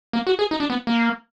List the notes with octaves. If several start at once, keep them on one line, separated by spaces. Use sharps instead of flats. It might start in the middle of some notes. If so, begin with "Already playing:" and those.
A#3
F#4
G#4
D#4
D4
B3
A#3